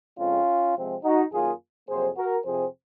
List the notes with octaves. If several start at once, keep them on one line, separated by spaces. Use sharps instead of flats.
F2 C#3 G#3 C4 C#4 F4
C3 F3 G#3 C4
D#4 F#4
F#2 D#3 F#3 A#3 F4 G#4
F2 C3 F#3 A#3 G#4 C5
F#4 A#4
F2 C3 F3 C4 G#4 C5